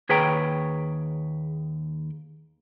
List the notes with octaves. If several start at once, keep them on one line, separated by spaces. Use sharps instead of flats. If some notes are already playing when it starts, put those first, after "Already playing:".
D#2 G#4 B4 C#5 G5 A#5